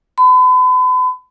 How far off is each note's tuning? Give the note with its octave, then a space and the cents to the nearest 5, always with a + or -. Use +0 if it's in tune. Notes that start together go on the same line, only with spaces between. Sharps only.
B5 +40